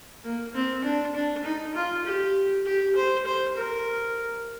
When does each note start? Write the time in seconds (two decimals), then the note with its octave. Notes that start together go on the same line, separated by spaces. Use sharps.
0.25 A#3
0.54 C4
0.84 D4
1.15 D4
1.45 D#4
1.75 F4
2.06 G4
2.66 G4
2.96 C5
3.26 C5
3.56 A#4